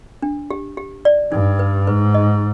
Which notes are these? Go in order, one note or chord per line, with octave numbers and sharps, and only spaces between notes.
D4
G4
G4
D5
G2 D#4
B4
G#2 B4
D#5